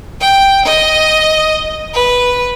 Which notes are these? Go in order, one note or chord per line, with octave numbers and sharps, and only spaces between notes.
G5
D#5
B4